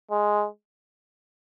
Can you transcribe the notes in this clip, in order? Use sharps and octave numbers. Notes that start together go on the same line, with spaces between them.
G#3